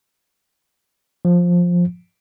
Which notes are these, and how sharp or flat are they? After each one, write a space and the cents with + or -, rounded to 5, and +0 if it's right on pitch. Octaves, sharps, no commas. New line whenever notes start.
F3 +10